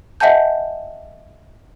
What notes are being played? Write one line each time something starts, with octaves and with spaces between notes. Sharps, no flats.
D#5 E5 F#5 G#5 A5 G6